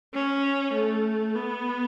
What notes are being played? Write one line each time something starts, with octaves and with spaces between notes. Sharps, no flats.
C#4
A3
B3